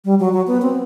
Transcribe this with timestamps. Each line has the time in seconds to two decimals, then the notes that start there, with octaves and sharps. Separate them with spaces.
0.05 G3
0.19 F#3
0.33 F#3
0.47 B3
0.62 C4